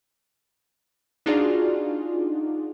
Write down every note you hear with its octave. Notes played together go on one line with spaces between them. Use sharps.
D4 D#4 F4 F#4 G#4 D5